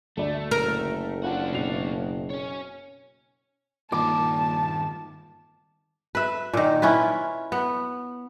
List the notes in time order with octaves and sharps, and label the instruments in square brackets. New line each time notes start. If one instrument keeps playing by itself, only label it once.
[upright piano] D2 D5 [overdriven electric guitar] A3
[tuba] F#1 [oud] A#4
[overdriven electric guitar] D4 F#4 [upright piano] F4 F#5
[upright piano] B2 C7 F7
[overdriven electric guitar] C#5 G#5
[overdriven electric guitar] G2 D#3 [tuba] A#2 [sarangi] A5 [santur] D6
[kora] B4 E5
A#2 D#3
C#4 E4 F4 B4
B3